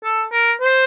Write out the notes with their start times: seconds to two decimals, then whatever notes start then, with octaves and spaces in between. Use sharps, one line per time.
0.04 A4
0.32 A#4
0.61 C5